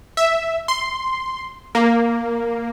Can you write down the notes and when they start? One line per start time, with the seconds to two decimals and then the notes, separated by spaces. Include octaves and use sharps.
0.17 E5
0.68 C6
1.75 A#3